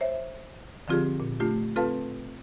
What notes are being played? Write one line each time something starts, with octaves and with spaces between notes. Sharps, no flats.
C5 C#5 E5
D3 F3 C4 F4 G4 G#4
A#2
A3 D4 F4 G4
C4 F4 A4 B4 F5 A5